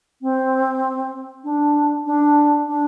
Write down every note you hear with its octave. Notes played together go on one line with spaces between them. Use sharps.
C4
D4
D4
D4